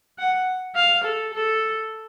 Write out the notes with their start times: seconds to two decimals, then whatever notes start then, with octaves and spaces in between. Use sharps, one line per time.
0.19 F#5
0.75 F5
1.04 A4
1.33 A4